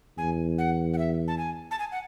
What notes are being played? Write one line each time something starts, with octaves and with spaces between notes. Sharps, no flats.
E2 G#5
F#5
F#5
E5
A5
G#5
A5
G#5
F#5